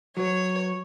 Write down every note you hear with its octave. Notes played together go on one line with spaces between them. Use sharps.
F#3 C#5